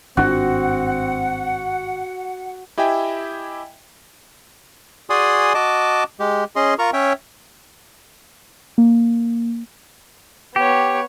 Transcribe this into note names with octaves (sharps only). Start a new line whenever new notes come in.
G#1 G2 C4 D4 F#4 F#5
E4 G4 D#5 E5 G5 G#5
F#4 G#4 D5 G#5 C6 D#6
F#4 D#5 A5 D6
G#3 G4
C#4 G#4 D#5 C6
F4 A#4 A#5 C#6
C#4 C#5 E5 G5
A#3
B3 G4 C#5